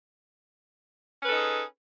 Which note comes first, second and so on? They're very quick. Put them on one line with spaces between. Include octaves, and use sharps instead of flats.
C#4 B4 A4 D#4 G#4